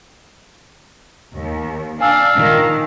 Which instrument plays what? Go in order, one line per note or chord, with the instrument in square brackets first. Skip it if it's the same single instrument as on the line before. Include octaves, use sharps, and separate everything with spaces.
[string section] D#2
[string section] D4 [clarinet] F5 [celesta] G#5 E6
[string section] A#2 D#3